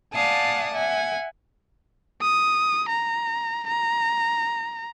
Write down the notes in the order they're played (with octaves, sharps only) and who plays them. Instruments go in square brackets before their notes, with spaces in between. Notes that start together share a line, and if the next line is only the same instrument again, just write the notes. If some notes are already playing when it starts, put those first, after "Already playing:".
[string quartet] D5 F5 F#5 G#5 A5 D#6
E5 F#5 G#5
[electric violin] D#6
A#5
A#5